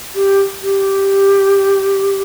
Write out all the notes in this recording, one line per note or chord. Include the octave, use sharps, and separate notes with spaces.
G4
G4